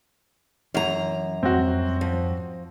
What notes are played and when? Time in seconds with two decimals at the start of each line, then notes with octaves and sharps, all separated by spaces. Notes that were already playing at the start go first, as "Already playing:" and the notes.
0.74 F#2 E3 A#5
1.43 F2 G#2 G3 C4 F#4
2.01 F3